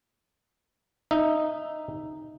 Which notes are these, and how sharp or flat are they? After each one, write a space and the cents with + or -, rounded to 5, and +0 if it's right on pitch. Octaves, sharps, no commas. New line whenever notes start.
D#4 -5 E5 +0